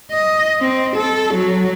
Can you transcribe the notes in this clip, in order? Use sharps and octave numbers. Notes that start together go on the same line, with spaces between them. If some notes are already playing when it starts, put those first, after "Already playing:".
D#5
C4
A4
F#3